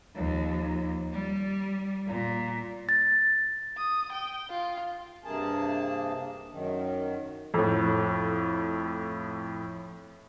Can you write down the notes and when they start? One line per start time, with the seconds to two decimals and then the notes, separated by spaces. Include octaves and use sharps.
0.15 D#2 F3
1.12 G3
2.07 A#2
2.89 A6
3.77 D#6
4.12 G5
4.50 F4
5.24 G2 C3 A#3 G#4 A5
6.50 F#2 D#3
7.54 F2 A2